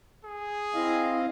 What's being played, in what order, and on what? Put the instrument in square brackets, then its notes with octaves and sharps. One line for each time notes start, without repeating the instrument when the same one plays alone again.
[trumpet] G#4
[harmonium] C4 D#5 F5 [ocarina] E4